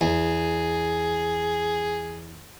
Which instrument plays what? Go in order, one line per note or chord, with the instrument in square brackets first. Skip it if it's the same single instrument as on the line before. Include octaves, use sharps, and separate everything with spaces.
[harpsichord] E2 [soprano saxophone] G#4